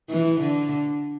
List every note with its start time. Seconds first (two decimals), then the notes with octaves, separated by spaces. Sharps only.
0.10 E3
0.41 D3